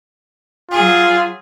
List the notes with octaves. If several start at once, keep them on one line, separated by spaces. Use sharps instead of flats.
F#3 F4 G#4